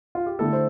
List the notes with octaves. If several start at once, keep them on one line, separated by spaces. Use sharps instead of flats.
F4
G4
D3 A3 E4 A4
C5